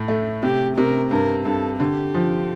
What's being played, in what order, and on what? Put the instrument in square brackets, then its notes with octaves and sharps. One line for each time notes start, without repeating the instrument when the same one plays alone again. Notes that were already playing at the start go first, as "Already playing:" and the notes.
Already playing: [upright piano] A2
A3
[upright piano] C3 [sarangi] G4
[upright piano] C3 [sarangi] A#4
[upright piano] G2 [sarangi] A#4
[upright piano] G2 [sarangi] A4
[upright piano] D3 [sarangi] G4
[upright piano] F3